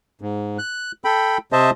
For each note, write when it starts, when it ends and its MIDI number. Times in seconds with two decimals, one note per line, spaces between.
0.21 0.58 44
0.58 0.92 90
1.04 1.38 69
1.04 1.38 79
1.04 1.38 83
1.52 1.70 48
1.52 1.70 72
1.52 1.70 75
1.52 1.70 76
1.52 1.70 81